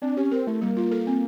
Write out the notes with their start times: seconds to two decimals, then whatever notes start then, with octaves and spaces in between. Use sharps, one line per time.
0.02 C4 D4
0.17 C#4 G4
0.31 C4 A#4
0.47 A3 E4
0.61 G3 A#3
0.77 F4
0.91 A4
1.07 C4